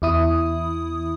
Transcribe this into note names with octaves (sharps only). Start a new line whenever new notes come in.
E2 E4 D#6